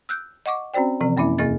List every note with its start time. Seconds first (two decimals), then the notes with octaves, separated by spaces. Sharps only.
0.09 E6 F#6 G6
0.46 D#5 F#5 C#6 D6
0.74 C4 C#4 F#4 C5 D5 G5
1.01 C3 E3 F3 C4
1.17 F#2 A#3 C#4 E4 E5
1.38 E2 C3 A#3 G#4 D#5 A6